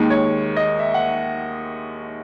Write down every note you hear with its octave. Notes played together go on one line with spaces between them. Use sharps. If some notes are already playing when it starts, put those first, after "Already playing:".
Already playing: D#2 D#3 G#3
C#5
D#5
E5
F#5